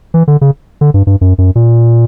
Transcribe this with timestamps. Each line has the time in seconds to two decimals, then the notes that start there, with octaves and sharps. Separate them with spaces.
0.14 E3
0.28 D3
0.41 C#3
0.81 D3
0.94 G2
1.07 G2
1.21 F#2
1.38 F#2
1.55 A#2